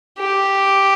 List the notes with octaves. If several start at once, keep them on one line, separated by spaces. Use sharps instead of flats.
G4